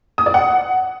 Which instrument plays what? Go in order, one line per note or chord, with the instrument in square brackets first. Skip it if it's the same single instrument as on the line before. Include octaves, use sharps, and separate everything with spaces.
[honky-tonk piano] D#6
D5
F#5